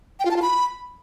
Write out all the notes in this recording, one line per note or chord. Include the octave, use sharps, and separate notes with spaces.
G5
F4
A5
F4
B5